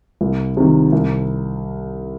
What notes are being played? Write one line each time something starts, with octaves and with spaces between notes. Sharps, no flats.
C2
C3 D#3
C2